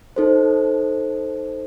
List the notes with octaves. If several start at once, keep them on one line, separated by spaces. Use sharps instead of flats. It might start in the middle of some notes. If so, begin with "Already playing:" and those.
D#4 A4 C5